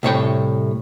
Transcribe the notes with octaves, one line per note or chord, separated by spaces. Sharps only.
C2 A2 C#5 G5